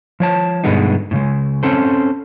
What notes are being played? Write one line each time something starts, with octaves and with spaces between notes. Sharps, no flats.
F3 C#5 A5
G2 B2 D3 G#3 B3 D#4
A2 C#3 G#3
C4 C#4 A4 C5